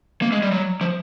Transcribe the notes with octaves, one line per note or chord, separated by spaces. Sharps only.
A#3
G#3
G3
F#3
F3